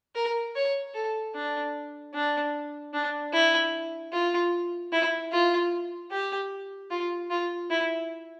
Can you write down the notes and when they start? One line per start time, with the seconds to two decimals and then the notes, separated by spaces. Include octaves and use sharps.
0.15 A#4
0.55 C#5
0.94 A4
1.35 D4
2.14 D4
2.93 D4
3.33 E4
4.13 F4
4.92 E4
5.32 F4
6.11 G4
6.91 F4
7.30 F4
7.70 E4